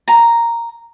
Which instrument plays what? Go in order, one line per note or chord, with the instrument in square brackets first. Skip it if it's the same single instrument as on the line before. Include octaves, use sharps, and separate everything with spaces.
[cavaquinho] A#5